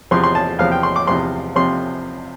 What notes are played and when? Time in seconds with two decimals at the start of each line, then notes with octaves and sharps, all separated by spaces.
0.11 E2 C3 F3 C6
0.24 C6
0.35 A5
0.59 E2 C3 F3 F5
0.72 G5
0.83 C6
0.96 D6
1.07 E2 C3 F3 C6
1.56 C3 F3 C6